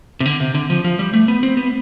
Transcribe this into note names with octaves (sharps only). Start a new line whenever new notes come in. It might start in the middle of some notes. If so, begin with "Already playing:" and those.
C3
D3
C3
D3
F3
F3
G3
A3
B3
C4
B3